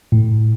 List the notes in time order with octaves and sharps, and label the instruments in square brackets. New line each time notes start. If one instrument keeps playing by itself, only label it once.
[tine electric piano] A2